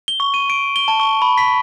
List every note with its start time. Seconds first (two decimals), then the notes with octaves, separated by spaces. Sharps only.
0.08 G7
0.20 C#6
0.34 D#7
0.50 D7
0.76 G7
0.88 A5
1.00 C#6
1.22 B5
1.38 B6